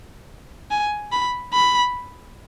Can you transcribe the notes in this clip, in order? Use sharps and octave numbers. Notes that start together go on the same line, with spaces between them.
G#5
B5
B5